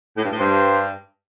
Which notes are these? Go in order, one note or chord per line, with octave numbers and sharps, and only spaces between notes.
A2
G2
A2
G2 C5